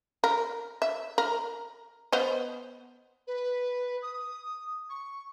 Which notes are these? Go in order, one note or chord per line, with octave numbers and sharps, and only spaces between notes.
A#4
E5
A#4
B3 C5 D#5
B4
D#6
C#6